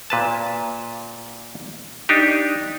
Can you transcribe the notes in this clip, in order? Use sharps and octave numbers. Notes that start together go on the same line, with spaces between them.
A#2 B4 A5
D4 D#4 G4